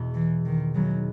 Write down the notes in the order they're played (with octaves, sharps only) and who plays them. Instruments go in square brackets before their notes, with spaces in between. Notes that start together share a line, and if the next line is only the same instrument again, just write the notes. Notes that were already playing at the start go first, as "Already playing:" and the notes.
Already playing: [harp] E2 B2 G#3
[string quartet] E3
D#3
[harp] E2 D#3 G#3 B3 [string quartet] F#3